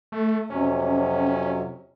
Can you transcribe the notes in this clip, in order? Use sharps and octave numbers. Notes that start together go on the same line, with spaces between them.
A3
F2 C3 F#3 C#4